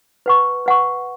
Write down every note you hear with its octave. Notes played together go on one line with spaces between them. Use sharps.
B4 F#5 C#6
B4 F#5 C#6